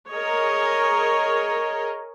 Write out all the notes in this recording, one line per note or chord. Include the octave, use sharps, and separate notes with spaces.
G#4 A#4 C#5 D#5